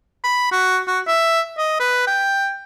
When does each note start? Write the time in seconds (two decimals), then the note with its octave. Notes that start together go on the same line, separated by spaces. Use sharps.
0.24 B5
0.52 F#4
0.87 F#4
1.07 E5
1.58 D#5
1.80 B4
2.07 G5